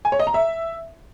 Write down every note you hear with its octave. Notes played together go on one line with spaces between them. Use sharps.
G#5
C#5
D#5
A#5
E5